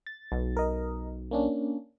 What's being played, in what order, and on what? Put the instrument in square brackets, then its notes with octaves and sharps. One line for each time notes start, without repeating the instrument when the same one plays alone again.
[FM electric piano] A6
[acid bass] B1
[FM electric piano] A#4 D#5
A#3 C#4 D4